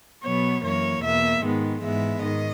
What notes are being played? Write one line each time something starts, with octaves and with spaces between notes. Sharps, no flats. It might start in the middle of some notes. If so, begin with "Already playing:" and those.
B2 F#3 B3 C#5
F#2 E3 A#3 C#5
E2 B2 A#3 E5
G#2 D#3 G#3 B3
G#2 E3 G#3 B3 E5
G#2 D#3 D#5